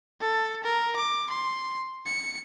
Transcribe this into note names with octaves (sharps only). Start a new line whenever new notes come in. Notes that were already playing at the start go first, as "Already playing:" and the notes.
A4
A#4
D6
C6
C#7